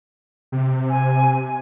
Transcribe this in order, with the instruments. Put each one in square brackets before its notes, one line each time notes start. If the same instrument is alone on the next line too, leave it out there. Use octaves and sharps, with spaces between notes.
[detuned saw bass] C3
[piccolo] G#5